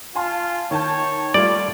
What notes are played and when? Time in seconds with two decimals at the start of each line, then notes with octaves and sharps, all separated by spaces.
0.16 F4 G#5 A5 C6
0.71 D#3 C#5 A5 G6
1.34 G3 A3 F4 D5